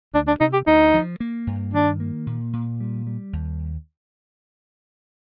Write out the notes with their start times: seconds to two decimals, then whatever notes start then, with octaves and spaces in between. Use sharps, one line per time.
0.14 D2 D4
0.27 D4
0.40 C3 D#4
0.53 G4
0.67 D2 D#4
0.94 F3
1.20 A#3
1.47 G2
1.73 D#3 D4
2.00 A#3
2.27 A#2
2.53 A#2
2.80 G3
3.07 G3
3.33 D#2